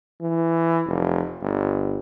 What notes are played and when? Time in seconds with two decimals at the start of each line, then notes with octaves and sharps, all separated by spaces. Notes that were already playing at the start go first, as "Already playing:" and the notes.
0.21 E3
0.87 F1
1.42 G1